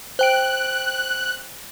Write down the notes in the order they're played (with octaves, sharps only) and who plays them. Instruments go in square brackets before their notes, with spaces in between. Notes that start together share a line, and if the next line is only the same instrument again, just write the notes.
[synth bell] C5 G5 D7 [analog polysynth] F#6